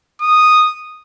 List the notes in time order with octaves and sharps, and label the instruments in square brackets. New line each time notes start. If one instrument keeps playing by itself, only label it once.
[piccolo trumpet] D#6